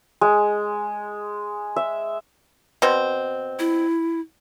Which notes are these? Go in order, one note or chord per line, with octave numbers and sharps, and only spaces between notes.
G#3
E5
B2 C4
E4